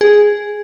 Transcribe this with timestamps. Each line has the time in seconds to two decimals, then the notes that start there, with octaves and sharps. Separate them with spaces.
0.01 G#4